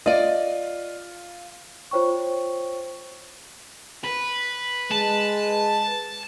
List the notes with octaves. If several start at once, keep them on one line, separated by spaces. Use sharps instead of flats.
F4 D5 D#5
F4 C5 C#5 G5 C#6
B4
G#3 A5